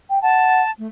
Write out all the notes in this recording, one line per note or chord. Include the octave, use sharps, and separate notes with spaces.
G5
F#5 A5
A3